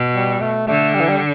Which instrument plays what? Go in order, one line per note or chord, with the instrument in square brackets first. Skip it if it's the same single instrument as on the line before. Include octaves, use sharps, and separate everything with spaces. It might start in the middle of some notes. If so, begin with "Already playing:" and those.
Already playing: [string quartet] B2
[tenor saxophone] G3
A3
[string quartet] D3 [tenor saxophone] A3
[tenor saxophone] G3
E3
G3